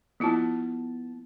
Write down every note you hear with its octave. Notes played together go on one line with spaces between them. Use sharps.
F3 B3 E4 F4 A5